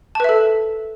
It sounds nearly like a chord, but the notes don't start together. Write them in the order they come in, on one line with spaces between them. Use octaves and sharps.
A5 B4 E5 A4